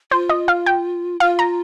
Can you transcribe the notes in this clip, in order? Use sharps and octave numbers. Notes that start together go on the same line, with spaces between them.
F4 C5
D#5
F5
G5
F4 F5
A#5